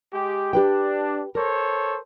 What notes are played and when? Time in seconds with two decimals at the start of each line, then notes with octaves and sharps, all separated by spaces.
0.12 G#3 G4
0.53 D4 G4 B4 G5
1.35 A4 A#4 C5 C#5